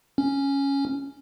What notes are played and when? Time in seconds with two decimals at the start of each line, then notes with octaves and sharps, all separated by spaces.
0.18 C#4